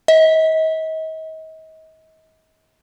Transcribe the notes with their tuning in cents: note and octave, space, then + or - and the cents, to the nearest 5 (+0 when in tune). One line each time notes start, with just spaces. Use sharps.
D#5 +40